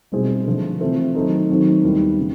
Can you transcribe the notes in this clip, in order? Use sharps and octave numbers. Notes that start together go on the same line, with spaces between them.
B2 G3 C4 E4 G#4
D3 F3 A3
C3 E3 A3 C4 F4
D#3 F#3 A3 C4 D#4
D#3 F#3 A3 C4
D#2 D#3 G3 B3 E4
C#3